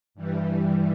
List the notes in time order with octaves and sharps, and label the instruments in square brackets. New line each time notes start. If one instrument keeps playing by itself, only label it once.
[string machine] G2 E3 G3